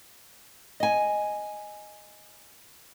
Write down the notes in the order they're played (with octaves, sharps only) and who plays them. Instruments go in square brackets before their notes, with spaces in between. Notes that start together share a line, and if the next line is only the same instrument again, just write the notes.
[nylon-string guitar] D#5 G#5